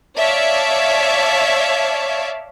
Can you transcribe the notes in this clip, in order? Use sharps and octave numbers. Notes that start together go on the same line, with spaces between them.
C#5 D5 E5 F5 A5